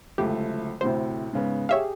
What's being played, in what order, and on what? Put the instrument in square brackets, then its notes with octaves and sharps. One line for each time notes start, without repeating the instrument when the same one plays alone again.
[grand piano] D1 C#2 A3 [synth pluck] G4
[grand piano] D2 A2 C3 [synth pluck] C5
[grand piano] G#2 C#3 B3
[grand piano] G4 G#4 [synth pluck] C#5 E5 F5